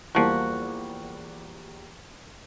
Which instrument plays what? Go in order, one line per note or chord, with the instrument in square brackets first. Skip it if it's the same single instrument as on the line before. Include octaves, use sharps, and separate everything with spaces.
[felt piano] E2 G3 A#3 [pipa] F3 F#4